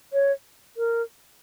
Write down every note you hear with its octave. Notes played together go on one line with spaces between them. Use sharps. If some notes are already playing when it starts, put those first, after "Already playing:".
C#5
A#4